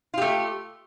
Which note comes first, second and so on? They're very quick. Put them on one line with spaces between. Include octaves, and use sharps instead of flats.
F4 G4 A3